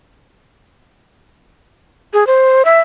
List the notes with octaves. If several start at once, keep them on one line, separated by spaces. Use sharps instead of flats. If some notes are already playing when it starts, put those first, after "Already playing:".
G#4
C5
E5